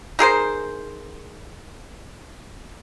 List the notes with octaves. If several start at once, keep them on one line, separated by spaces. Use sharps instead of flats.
D#4 G#4 A#4 C5